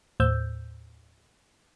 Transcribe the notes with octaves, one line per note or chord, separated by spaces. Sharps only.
D#2 A2 C5 E6 G6